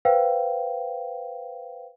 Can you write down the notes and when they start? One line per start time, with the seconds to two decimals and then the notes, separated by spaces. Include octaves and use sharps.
0.05 B4 C5 F5 G5